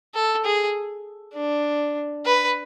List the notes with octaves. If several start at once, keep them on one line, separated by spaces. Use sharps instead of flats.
A4
G#4
D4
B4